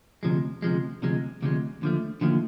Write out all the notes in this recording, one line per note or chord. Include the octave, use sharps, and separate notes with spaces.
D2 C3 F3 G#3
D2 C3 F3 G#3
D2 C3 F3 G#3
D2 C3 F3 G#3
D#2 D3 F3 A3
D#2 D3 F3 A3